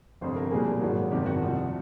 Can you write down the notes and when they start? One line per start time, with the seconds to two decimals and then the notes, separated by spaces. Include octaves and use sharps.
0.21 G1 F2 C3 C5
0.36 A#4
0.51 B1 A#2 G3 A#3 G#4
0.81 G#1 G#2 D#3 F#3
1.11 F#1 E2 C3 D#3 G4
1.26 F#4
1.41 C2 C3 F3